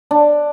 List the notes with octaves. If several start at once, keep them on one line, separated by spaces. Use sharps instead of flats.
D4